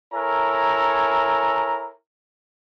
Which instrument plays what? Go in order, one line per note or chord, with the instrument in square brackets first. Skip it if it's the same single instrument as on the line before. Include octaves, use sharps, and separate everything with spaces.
[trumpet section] E4 A4 A#4 C#5 G#5 A#5